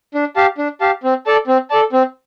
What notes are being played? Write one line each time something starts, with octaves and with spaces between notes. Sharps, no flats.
D4
G4 F5 A5
D4
G4 F5 A5
C4
A4 D5 A5
C4
A4 D5 A5
C4